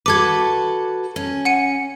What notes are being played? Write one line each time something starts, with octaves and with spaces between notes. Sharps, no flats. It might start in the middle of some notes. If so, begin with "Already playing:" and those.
F#4 A4 B4 D6 G#6
C#4
F#5 C#7 D#7